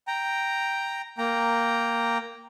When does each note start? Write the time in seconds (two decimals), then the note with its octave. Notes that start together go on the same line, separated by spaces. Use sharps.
0.07 G5 A#5
1.18 A#3 G5 A#5